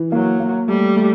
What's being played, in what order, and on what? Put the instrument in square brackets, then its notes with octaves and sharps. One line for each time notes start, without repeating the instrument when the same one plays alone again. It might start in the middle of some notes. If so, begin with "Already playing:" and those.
Already playing: [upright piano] E3
[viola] F#3 [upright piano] A#3
[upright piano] A#3
[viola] G3 [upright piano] A3
[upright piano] A3